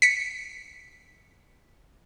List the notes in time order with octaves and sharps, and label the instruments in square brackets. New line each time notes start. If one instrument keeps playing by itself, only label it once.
[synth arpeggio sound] B6 C#7